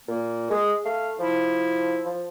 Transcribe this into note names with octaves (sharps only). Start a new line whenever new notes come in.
A#2 A#3
G#3 G#4
A3 F5
F3 E4
F3